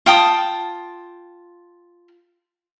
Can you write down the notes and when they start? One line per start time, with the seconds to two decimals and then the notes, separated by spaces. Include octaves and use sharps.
0.06 F4 G5 A5 D#6